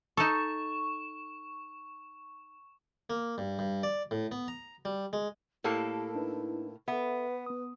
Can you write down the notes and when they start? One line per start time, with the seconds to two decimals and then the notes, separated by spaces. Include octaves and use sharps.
0.17 D#4 A4 C#6 E7
3.10 A#3
3.38 G2
3.59 G2
3.83 D5
4.11 A2
4.31 B3
4.48 A#5
4.85 G3
5.13 G#3
5.64 A2 A#3 E4 G4 A4 A#4
6.15 D4 D#4 B4
6.88 B3 A4 B4 E5
7.46 B3 D#6